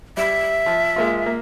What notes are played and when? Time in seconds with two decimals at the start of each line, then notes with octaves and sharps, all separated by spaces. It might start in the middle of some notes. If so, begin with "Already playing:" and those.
0.17 G3 E5
0.66 F3
0.96 G#3 A#3 F4
1.26 A#3